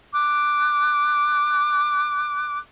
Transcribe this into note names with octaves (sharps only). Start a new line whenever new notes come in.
D6 F#6